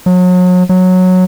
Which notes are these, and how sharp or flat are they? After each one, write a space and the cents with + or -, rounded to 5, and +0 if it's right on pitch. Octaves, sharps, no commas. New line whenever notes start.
F#3 -35
F#3 -10